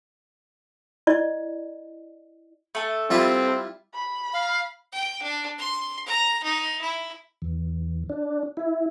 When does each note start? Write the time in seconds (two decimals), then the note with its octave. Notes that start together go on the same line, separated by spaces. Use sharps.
1.07 E4 D5 D#5
2.75 A3 A4
3.10 G3 C4 E4 F4
3.94 B5
4.33 F5
4.92 G5
5.23 D4
5.58 C6
6.06 A#5
6.44 D#4
6.81 E4
7.42 E2
8.10 D4
8.57 E4